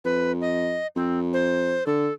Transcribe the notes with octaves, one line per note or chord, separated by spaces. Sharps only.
F2 B4
D#5
F2 C4
C5
D3 A4